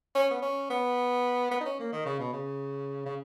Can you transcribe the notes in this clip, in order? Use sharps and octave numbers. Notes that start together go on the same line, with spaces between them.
C#4
B3
C#4
B3
B3
D#4
C#4
A#3
D#3
C#3
B2
C#3
C#3